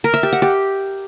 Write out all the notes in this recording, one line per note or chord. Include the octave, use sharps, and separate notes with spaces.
A#4
E5
G4
F#5
G4